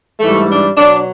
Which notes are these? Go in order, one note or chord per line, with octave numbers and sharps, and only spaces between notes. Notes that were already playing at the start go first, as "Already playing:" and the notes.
G#2 E3 G3 A3
D4
B2 F#3 D4